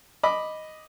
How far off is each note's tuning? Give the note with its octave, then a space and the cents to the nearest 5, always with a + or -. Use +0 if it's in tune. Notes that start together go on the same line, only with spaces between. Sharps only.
D#5 +0 B5 +0 D6 +10